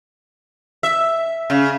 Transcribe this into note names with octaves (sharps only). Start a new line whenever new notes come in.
E5
C#3